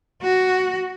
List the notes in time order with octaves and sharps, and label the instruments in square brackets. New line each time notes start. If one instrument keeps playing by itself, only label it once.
[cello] F#4